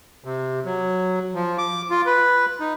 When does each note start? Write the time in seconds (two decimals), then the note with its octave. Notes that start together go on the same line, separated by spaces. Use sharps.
0.24 C3
0.65 F#3
1.35 F3
1.58 D6
1.90 F4
2.06 B4
2.60 D#4